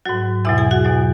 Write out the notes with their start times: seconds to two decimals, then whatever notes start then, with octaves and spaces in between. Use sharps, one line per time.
0.05 G#2 F#3 F#4
0.45 E2 B2 F#3 E4 E5
0.58 G#4 G#5
0.71 F#4 F#5
0.85 E2 B2 F#3